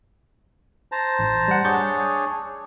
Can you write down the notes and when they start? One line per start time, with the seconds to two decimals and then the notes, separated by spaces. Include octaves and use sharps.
0.92 C5 A5 A#5
1.19 A1
1.48 G3 F#5
1.65 D4 G#4 C#5 C#6 G6 A6